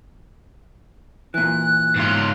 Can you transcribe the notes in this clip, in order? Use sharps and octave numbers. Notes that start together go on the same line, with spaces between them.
A#2 E3 F#6
G#2 F4